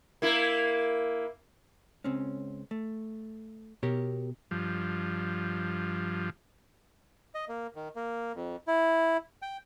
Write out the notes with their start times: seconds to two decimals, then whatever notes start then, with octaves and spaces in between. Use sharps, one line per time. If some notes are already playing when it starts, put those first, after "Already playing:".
0.22 A#3 E4
2.04 C#2 C4 C#4
2.71 A3
3.83 B2 G4 A#4 C#5
4.51 G2 F3
7.35 D#5
7.49 A#3
7.75 D#3
7.96 A#3
8.35 F2
8.67 E4
9.42 G5